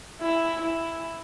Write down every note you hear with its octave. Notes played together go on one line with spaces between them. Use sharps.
E4
E4